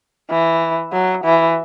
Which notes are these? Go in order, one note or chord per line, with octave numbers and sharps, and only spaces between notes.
E3
F#3
E3